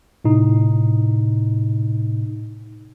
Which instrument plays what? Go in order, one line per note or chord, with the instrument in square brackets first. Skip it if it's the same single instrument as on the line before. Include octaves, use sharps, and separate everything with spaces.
[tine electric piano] A2 C3 D#4